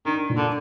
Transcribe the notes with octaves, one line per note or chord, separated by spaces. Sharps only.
D#3 D4
A#2
D3